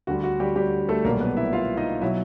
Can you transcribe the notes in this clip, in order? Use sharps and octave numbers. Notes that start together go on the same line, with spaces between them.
D2 D3 G3 F#4
F#4
G3 G4
G3 G4
A3 A4
B1 A#2 G3 A#3 A#4
B3 B4
E4 E5
F4 F5
D#4 D#5
B2 F#3 E4 E5